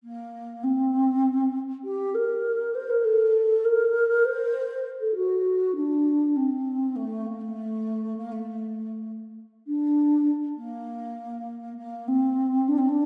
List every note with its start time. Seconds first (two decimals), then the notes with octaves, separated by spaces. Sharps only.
0.03 A#3
0.63 C4
1.84 G4
2.14 A#4
2.74 C5
2.89 A#4
3.04 A4
3.64 A#4
4.25 C5
5.00 A4
5.15 F#4
5.75 D4
6.36 C4
6.95 A3
7.25 A#3
7.41 A3
8.16 A#3
8.31 A3
9.67 D4
10.56 A#3
11.77 A#3
12.07 C4
12.68 D4
12.78 C4
12.88 D4